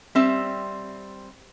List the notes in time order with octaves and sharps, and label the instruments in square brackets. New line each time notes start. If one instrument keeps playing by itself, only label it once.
[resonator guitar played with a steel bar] G3 C4 E5